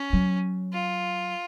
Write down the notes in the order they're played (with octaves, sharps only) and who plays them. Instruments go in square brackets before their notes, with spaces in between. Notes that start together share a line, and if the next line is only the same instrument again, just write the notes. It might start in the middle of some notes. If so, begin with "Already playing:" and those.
Already playing: [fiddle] C#4
[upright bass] F#3
[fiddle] F4